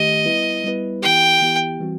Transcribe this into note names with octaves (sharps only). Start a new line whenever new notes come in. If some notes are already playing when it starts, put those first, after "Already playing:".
Already playing: D#3 A3 G4 D#5
G3 B3 E4 B4
G3 B3 E4 B4
E3 B3 E4 G4 G5
E3 B3 E4 G4
E3 G3 C4 F#4